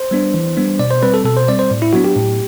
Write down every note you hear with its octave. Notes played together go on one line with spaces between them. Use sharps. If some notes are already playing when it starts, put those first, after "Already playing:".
Already playing: C5
G3 B3 D4
E3
G3 B3 D4
B2 D5
C5
G3 C4 B4
A4
B2 A4
C5
G3 C4 D5
C5
A2
E4
F#3 B3 D4 F#4
G4
A2